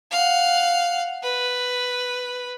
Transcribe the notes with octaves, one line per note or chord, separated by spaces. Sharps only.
F5 F#5
B4